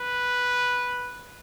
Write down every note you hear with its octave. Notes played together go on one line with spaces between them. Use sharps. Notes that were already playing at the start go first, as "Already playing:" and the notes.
Already playing: B4